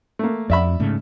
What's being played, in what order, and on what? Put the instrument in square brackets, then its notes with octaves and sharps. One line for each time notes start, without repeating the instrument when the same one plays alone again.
[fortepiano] A3 A#3
[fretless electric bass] F2 [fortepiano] D5 E5 B5
[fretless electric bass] G#2 C#3 A3